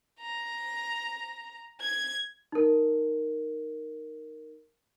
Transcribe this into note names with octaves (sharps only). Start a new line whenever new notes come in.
A#5
G#6
D#4 A#4